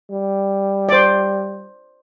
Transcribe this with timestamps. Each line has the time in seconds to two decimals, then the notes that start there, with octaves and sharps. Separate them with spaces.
0.10 G3
0.89 C5 D5